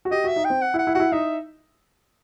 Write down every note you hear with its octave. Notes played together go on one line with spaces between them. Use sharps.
F#4
G4 D#5
F#4 E5
D#4
G5
C4
F#5
E4
F#5
E4
F#4 F#5
E4
D#4 E5